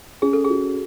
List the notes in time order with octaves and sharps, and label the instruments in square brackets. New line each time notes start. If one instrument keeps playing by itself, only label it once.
[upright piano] C#4 [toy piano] G#4
[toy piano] A4
G#4
[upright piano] F#4